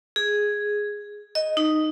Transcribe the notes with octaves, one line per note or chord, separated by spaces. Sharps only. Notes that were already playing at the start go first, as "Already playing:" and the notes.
G#4
D#5
D#4